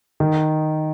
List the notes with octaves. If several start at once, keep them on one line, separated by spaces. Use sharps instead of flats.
D#3